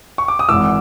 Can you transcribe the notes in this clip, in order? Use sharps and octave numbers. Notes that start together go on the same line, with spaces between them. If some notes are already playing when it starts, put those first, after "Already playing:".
C#6
D6
D#6
G#1 G#2 E3 D6 E6